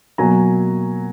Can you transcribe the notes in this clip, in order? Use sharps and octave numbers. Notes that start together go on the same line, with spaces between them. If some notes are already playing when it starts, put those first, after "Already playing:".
B2 F#3 A#3 G#5 A#5